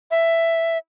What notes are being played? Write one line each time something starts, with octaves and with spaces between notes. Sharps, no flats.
E5